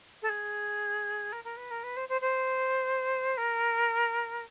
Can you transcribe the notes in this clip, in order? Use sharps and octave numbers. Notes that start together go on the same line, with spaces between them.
A4
G#4
A#4
A#4
B4
A#4
B4
C5
C5
C5
A#4